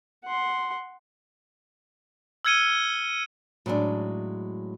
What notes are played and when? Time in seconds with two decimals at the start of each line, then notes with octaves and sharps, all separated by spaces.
0.24 F#5 C6
2.45 E6 F6 G#6 C#7 D#7 G7
3.66 A2 F#3 G#3 C#4 D4